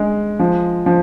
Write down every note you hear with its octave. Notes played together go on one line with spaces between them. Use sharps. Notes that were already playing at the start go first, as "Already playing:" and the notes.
Already playing: G#3
F3
F3